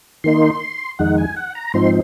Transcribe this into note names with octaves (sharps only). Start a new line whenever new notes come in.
D#3 A#3 D#4 C6
F2 D#3 G#3 D#4 F#5
G#5
F#5
A#5
G#2 F3 C4 D#4 C6